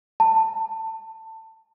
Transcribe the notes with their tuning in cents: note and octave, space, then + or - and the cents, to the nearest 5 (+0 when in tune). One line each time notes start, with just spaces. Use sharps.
A5 +20